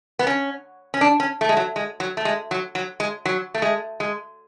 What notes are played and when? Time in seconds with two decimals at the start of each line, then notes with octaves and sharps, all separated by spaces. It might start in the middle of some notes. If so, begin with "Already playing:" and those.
0.19 B3
0.27 C#4
0.94 C#4
1.01 D4
1.20 C#4
1.41 A3
1.49 G#3
1.57 F#3
1.76 G#3
2.00 F#3
2.17 A3
2.25 G#3
2.51 F#3
2.75 F#3
3.00 G#3
3.25 F#3
3.54 A3
3.62 G#3
4.00 G#3